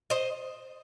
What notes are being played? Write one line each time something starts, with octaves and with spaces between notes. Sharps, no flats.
C5 D#5